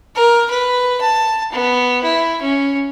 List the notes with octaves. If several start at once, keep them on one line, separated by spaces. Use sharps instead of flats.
A#4
B4
A5
B3
E4
C#4